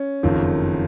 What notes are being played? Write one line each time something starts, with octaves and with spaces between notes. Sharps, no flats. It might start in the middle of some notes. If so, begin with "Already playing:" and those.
Already playing: C#4
F#1 F2 D#3